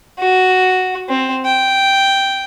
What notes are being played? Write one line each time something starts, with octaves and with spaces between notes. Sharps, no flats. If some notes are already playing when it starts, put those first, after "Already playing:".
F#4
C4
G5